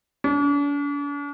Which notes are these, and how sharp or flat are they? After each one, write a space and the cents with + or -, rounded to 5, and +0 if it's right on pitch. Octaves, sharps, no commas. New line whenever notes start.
D4 -45